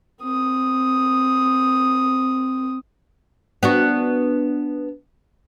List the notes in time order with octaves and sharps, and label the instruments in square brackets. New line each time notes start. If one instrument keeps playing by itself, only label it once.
[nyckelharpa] C4 D#6
[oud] B3 D4 F#4